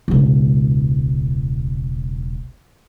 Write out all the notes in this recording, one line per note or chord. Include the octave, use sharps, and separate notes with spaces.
E1 C#2